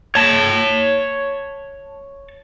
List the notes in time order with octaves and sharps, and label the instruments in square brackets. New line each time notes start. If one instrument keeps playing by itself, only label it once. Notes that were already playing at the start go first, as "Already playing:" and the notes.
[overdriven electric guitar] C#5 A5